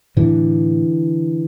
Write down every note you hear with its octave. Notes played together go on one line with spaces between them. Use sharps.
A2 D3 E3